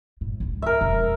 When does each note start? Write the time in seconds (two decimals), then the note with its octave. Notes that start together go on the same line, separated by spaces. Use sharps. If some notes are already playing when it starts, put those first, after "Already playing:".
0.21 A2
0.40 C#2 G#2
0.62 A#4 E5
0.81 E1 F2